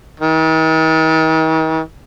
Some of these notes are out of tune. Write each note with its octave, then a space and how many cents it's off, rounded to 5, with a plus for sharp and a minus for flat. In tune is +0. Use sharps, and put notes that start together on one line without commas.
D#3 +45